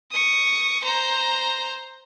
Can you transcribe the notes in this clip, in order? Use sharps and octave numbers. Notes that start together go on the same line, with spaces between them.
C#6 D#6
C5 A#5